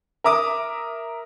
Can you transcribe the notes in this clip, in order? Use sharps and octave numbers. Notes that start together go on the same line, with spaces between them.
A#4 E5 D6 D#6